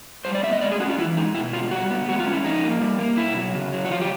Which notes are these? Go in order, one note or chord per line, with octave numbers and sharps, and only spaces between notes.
G3 C5
D5
B3 E5
D#5
G#3 D5
G#4
C#4 F#4
F4
E3 E4
G#3 D#4
B2 E4
G#3 F4
G3 F#4
B3
G#3 F#4
F4
C#4
E4
F3 D#4
A#3
G3
A#3
B2 E4
F#3
C#3
F#3
F#4
F3 F4
G4